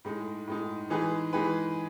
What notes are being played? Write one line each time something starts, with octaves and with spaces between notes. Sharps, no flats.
A2 G#3 D#4
A2 G#3 D#4
E3 G#3 D#4 G#4 B4
E3 G#3 D#4 G#4 B4